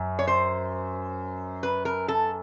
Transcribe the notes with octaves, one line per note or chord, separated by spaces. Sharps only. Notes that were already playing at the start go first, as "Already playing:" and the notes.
Already playing: F#2
C#5
C5
B4
A#4
A4